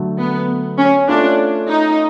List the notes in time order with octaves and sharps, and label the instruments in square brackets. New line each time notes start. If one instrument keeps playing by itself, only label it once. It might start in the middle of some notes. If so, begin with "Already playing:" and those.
Already playing: [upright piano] D3 F#3 A3
[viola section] B3
C#4
[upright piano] A3 C#4 F4 [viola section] D4
[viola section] D#4